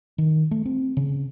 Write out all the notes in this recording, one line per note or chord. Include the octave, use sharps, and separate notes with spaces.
D#3
A3
C4
C#3